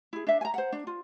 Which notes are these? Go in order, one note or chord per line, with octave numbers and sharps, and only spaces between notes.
E4 G#4
D4 E5
G#5 A#5
C5 F#5
D4
F4